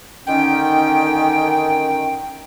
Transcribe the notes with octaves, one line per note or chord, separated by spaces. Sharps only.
D3 D#3 C#4 G5